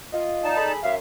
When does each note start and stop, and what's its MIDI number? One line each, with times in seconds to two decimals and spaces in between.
0.12 0.52 65
0.12 0.52 75
0.44 0.72 63
0.44 0.73 74
0.44 0.72 81
0.57 0.77 68
0.57 0.77 69
0.57 0.77 83
0.83 0.98 42
0.83 0.95 76
0.83 0.95 77